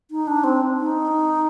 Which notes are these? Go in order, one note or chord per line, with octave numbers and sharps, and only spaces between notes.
D#4
D4
C4
D#4